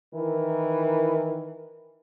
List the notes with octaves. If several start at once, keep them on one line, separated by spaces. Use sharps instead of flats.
D#3 E3 E4 A#4